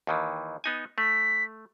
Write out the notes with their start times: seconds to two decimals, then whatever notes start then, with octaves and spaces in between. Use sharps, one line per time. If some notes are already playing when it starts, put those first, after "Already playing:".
0.07 D#2 D#3 E3
0.64 B3 D#4 G#5
0.98 A3 B6